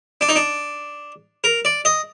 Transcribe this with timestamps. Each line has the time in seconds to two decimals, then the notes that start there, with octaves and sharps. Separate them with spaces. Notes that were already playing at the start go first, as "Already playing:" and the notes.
0.21 D4
0.29 D#4
0.36 D4
1.44 A#4
1.65 D5
1.85 D#5